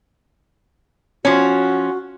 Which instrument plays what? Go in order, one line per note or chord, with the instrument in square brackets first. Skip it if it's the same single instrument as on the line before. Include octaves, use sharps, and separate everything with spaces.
[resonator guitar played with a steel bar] F3 C#4 [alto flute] F#4